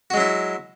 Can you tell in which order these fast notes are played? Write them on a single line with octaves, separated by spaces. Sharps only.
F#4 G#3 F#3 E4